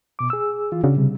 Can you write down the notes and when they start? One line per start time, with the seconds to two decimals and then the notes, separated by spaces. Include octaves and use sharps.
0.19 B2 D6
0.30 G#4 E6
0.72 E3 F4
0.84 C#3 C#4 D4 F#4
0.97 C3 G3